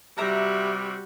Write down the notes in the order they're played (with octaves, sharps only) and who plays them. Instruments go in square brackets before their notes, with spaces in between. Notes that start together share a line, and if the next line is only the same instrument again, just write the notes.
[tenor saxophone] C3 [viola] G3 F#4 [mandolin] E5 A#5